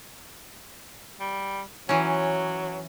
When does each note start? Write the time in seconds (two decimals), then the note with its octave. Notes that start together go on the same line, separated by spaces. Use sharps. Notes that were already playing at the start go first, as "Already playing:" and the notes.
1.20 G3
1.89 E3 F#3 C#4